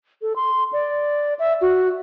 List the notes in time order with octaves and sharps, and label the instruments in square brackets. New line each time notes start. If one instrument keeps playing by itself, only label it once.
[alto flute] A4
C6
D5
E5
F#4